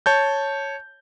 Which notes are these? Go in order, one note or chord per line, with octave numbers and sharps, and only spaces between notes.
C#5 A5 G6